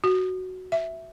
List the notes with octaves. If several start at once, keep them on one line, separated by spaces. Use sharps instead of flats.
F#4
E5